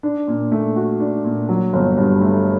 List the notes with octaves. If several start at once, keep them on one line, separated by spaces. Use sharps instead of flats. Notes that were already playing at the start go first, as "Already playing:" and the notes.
D4
A#2
A3
F#4
D4
A#2
F#3
G1
G2
A3